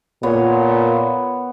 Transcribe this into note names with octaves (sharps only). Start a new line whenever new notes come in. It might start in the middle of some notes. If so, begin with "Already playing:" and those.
A#2 B3 C#5